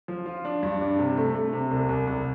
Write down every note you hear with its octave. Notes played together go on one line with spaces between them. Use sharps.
F3
F4
D4
G2
D4
C3
A3
A3
C3
C2
C2
C2